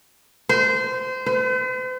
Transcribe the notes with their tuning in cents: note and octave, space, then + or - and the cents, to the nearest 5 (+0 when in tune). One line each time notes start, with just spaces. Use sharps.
C5 -25
C5 -45